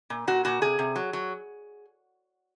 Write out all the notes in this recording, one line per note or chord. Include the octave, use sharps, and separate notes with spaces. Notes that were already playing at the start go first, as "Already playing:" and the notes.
A#2
A#2 F#4
A#2 F#4
C3 G#4
C3
F#3
F#3